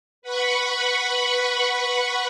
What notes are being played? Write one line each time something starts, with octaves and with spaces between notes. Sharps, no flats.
B4 F#5 B5 C#6